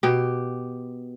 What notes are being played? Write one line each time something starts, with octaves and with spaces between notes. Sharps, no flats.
B2 G4